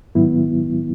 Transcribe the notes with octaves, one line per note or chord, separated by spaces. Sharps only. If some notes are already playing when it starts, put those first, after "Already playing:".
G#2 D#3 F#3 B3 E4